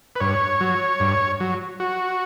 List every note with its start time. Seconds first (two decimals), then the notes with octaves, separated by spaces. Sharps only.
0.16 B4
0.20 G2 C#5
0.61 F#3
1.00 G2
1.40 F#3
1.80 F#4